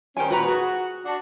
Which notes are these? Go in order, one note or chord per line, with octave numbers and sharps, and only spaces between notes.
D#3 G3 C#4 C5 G5 G#5
A#2 D#3 F#4 B4 F#5 A#5
F#4 G#4
D4 F#4